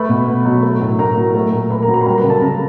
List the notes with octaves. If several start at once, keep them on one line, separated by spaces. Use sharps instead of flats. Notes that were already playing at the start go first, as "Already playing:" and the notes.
Already playing: A3 B4 B5
B2
B2
F#3
A3
A2
A2 A#4 A#5
F#3
A3
A#2
A#2 B4 B5
A#4 A#5
F#3
A#4 A#5
B5
G3 A#4 A#5
B4 B5
C#3
A4 A5
C#3 A#4 A#5